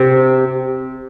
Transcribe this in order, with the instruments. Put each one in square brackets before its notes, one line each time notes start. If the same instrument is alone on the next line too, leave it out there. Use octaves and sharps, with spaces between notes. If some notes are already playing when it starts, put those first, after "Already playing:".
Already playing: [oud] C3 C4